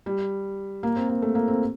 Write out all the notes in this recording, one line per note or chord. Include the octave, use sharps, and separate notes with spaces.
G3
A#3
C4
A#3
A3
A#3
C4